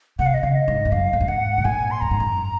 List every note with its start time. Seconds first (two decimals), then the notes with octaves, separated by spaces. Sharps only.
0.19 C3 F#5
0.26 F5
0.34 D#5
0.42 C#3 F5
0.55 D#5
0.68 G#2
0.85 F2
0.92 F#2 F5
1.13 F2
1.20 F#2
1.28 G#2 F#5
1.58 C3
1.65 A#2 G#5
1.91 C6
2.00 F#2 A#5
2.11 G#2
2.20 F#2